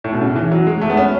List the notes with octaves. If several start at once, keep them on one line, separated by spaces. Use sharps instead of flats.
A2
B2
C#3
E3
F#3
G#3
A3
B3
C#4